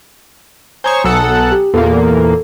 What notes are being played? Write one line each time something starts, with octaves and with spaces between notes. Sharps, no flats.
C5 C#5 G#5 A#5 C#6 D#6
B1 A4 F#5
G4
E2 A#2 A#3 A4